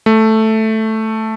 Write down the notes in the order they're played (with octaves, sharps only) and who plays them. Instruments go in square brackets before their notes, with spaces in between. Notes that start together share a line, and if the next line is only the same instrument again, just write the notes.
[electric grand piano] A3